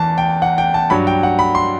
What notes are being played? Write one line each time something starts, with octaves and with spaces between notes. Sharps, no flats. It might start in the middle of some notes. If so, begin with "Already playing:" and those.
Already playing: E2 E3 A5
G5
F#5
G5
A5
G2 F#3 B5
G5
F#5
B5
C6